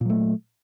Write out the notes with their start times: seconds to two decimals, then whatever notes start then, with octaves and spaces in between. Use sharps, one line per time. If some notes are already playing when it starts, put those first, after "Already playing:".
0.01 A#2
0.05 F#3
0.10 A3